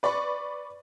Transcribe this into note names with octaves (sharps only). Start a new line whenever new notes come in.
B4 D5 B5 C#6